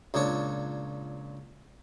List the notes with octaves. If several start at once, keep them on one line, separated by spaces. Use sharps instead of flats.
C#2 A#2 D4 C#5